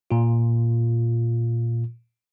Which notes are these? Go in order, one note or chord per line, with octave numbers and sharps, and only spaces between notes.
A#2 F4